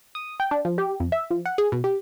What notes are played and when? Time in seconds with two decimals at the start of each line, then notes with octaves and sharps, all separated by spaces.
0.15 D#6
0.40 G5
0.51 D4
0.65 F3
0.78 G4
1.00 F2
1.12 E5
1.31 F3
1.46 F#5
1.58 G#4
1.72 B2
1.84 G4